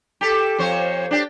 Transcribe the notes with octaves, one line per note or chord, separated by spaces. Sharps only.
G4 A4
F2 C5 C#5
D4 G4